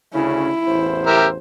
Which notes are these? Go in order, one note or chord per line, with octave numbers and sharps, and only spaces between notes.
D2 C#3 C#4 E4
A1 E2 C5
G4 A#4 E5